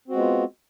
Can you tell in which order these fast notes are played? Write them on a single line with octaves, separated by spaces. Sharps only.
C4 F#4 G#3 B3 F4